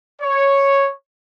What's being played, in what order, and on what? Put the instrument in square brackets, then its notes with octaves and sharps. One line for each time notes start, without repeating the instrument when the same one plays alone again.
[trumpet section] C#5